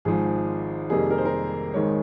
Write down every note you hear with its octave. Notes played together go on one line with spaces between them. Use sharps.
G#1 G#2 F3 G#3 G#4
F2 C3 D#3 G3 A#3 G#4
A#4
C5
A#4
G#1 G#2 D#3 G#3 C#5